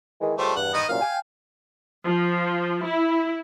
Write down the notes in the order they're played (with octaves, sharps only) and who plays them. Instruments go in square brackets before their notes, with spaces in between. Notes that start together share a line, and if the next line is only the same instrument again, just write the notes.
[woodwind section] D#3 E3 G#3
[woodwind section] C#2 C5 C6 [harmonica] G3 A3
[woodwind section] E2 G2 [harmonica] F#5
[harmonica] D#3 B3 D#5
[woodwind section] C2 F#2 A#2 [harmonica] F5
[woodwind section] G5 G#5
[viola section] F3
E4